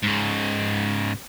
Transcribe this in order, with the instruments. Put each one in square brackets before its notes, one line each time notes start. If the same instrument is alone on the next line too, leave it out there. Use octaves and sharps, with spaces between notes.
[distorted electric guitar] G#2 C#3